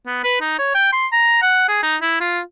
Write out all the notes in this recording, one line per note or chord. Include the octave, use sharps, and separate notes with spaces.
B3
B4
D#4
C#5
G5
C6
A#5
F#5
G#4
D#4
E4
F4